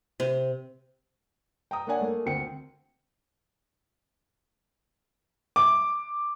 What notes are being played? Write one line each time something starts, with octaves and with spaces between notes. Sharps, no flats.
C3
G5 A#5 D#6
A#3 D4 C#5 F#5 G#5
A3 A#3
D2 C4 G5 C#7
D6